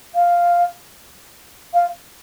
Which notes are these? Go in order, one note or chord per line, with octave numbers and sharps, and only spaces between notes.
F5
F5